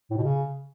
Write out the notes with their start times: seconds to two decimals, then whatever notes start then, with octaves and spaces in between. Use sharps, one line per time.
0.11 A2
0.17 B2
0.23 C#3